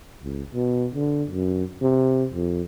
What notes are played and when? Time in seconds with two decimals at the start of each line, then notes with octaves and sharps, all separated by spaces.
0.23 C#2
0.54 B2
0.94 D3
1.30 F#2
1.81 C3
2.33 F2